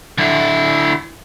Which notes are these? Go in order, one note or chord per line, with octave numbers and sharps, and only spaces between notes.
D3 E4